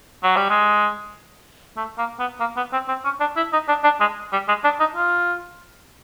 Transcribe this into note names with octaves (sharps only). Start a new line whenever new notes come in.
F#3
G3
G#3
A3
A#3
B3
A#3
B3
C4
C4
C#4
D4
E4
D#4
D4
D4
G#3
G3
G#3
D4
D#4
F4